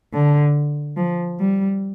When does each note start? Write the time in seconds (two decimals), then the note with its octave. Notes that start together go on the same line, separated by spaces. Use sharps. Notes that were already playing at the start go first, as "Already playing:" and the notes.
0.14 D3
0.97 F3
1.40 G3